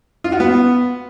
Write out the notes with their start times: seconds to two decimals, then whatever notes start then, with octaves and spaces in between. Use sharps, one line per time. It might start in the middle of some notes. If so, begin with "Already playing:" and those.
0.24 F4
0.32 F#4
0.40 B3